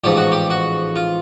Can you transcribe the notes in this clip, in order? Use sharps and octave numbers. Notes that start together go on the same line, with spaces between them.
A1 G#2 F3 G4
F#4
G4
F#4
F4